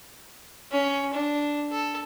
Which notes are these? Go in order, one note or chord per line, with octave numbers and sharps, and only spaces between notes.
C#4
D4
A4